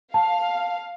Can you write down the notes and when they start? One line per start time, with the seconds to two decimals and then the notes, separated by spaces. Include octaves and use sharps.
0.14 F5 A5